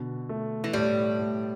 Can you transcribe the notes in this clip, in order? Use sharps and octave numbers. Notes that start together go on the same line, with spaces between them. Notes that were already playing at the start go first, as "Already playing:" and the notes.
Already playing: B2 D3
A3
E3
A2 G3
A2